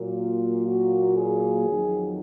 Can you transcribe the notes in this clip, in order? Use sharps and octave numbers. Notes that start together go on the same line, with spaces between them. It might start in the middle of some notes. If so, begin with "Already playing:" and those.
Already playing: A#2 F#3 A#3
F4
F#4
G#4
F2 D#3 F#3